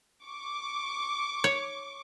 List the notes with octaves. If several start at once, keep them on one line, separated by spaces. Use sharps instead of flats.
C#6 D6
C#5